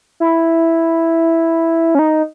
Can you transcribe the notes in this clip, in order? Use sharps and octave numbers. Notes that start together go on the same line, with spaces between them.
E4
C#4
D#4